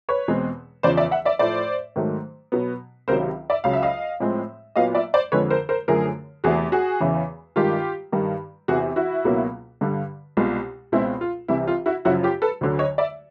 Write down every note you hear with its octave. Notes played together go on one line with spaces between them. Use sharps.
B4 C#5
E2 B2 G#3 C4
E2 C#3 F3 C5 D5
D5 E5
E5 F#5
D5 E5
A2 F3 A3 C5 D5
G#2 D#3 F#3 A3
B2 F#3 B3
C#2 C3 D#3 F#3 A#4 C5
D5 E5
C#2 C#3 F#3 F5
E5
D#5 F5
A2 F3 G#3 C4
A#2 F#3 B3 D#5 F5
D5 E5
C5 D5
F2 D3 F3 G#3 B4 C#5
A#4 C5
A#4 C5
F#2 D3 F3 A3 G#4 A#4
E2 C3 E3 A3 F#4 G#4
F#4 G#4
E2 C#3 E3
G2 D#3 G#3 F4 G4
G2 D#3 G3
E2 C3 E3 F#4 G#4
E4 F#4
C#2 B2 F#3 A#3
G2 D3 G3
C2 B2 G#3 F4
C#2 B2 G#3 C4 E4
F4
C2 C3 E3 E4
F4
E4 F#4
F#2 C#3 F3 E4 F#4
F4 G4
A4 B4
D2 D3 F#3
C#5 D#5
D5 E5